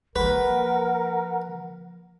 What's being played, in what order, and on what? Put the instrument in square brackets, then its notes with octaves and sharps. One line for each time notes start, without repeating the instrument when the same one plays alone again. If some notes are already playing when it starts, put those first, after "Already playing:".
[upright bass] F3 A#3 [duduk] A#4 [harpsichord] B4 [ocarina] F#5